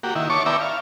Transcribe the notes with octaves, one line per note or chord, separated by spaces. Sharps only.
A#3 F#4 G4
D#3 E4
C#5 A5 C#6 D6
B3 E4 D5 E5 G5 A#5
F5